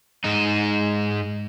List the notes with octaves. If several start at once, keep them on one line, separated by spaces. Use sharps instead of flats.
G#2 D#4